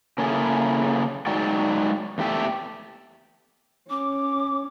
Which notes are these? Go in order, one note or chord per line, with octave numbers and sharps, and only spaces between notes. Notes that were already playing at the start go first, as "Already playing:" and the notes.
C#3 A#3 C#4 E4 G#4 A4
F#3 G#3 D#4 F#4 D5 G5
E2 A3 G4 E5
C#4 D6